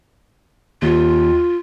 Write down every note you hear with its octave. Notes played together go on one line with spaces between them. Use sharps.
D#2 F4